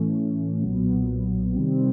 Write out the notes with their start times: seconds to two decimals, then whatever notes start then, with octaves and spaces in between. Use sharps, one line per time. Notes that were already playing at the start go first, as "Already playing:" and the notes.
Already playing: A2 E3 A3 C#4
0.62 B1 A#2 F#3 B3
1.55 C3 D#3 G3 C4